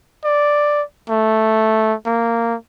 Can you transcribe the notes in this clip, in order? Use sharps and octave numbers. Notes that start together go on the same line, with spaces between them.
D5
A3
A#3